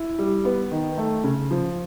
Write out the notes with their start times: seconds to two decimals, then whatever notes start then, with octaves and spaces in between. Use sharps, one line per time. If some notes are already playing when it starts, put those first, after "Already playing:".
Already playing: E4
0.19 G3
0.45 B3
0.71 D#3
0.98 A3
1.24 C#3
1.51 F3